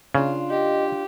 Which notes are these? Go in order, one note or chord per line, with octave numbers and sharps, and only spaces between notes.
C#3 D4 F4
G4 D#5